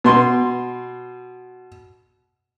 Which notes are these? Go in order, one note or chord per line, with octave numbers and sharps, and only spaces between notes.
B2 C6